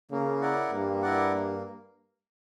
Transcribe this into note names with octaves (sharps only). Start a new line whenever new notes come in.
C#3 A#3
E4 A#4 D5 F#5
G2 A#3
E4 A#4 D5 F#5
A#3